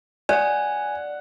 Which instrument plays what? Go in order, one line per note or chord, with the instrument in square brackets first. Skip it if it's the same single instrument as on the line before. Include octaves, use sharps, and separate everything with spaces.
[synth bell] D5 [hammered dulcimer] F#5 [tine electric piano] G#5